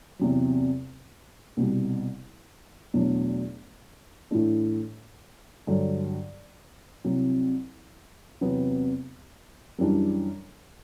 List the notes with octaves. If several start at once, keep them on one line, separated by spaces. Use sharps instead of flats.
E2 C3 F#3
C2 B2 G3
E2 B2 F#3 A3 D4
A2 E3 A3 D4
G2 D3 F#3
C2 C3 F#3
E2 C3 F#3 B3
F#2 E3 G3 D4